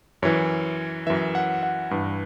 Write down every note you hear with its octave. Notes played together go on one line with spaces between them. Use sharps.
F#2 E3 C#5
F#2 E3 E5
F#5
F#5
G2 E3